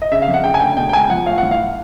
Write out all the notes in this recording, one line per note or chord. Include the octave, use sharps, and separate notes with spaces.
D#5
C#3 E5
F5
F2
F#5
C#3 G5
G#5
D2 G5
B2 G5
G5
C#2 G#5
G5
F3 F#5
A2 F5
E3 F#5
F5